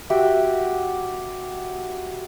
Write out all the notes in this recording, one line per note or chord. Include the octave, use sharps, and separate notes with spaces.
F#4 G4 E5